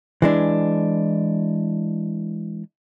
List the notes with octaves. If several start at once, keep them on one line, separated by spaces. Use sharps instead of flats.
E3 G#3 D4